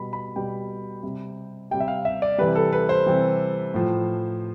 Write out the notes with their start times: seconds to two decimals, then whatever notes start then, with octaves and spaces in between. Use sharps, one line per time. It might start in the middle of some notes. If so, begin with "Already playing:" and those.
Already playing: B2 G3 B5
0.13 B5
0.36 B2 G3 G5
1.03 C3 G3
1.71 C3 G3 G5
1.80 E5
1.88 F5
2.05 E5
2.22 D5
2.38 C3 E3 G3 B4
2.55 A4
2.73 B4
2.89 C5
3.06 C3 E3 G3
3.74 A2 F3